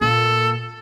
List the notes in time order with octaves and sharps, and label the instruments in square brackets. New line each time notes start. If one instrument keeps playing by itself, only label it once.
[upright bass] A#2 [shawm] A4